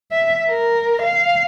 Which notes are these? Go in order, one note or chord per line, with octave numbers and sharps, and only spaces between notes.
E5
A#4
F5